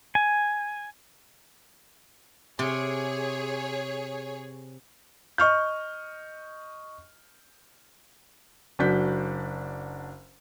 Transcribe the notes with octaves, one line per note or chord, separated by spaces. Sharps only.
G#5
C3 G#4 C#5
D#5 C#6 F6 G6
F#1 F#3 D4 F#4 G6 B6